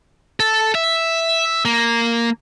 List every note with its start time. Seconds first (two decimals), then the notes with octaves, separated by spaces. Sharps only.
0.40 A4
0.75 E5
1.65 A#3